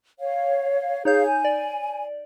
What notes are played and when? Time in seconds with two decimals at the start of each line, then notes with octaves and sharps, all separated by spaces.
0.20 C#5 F5
1.05 D#4 G#4 C#5 F5 G6
1.26 G#5
1.45 D5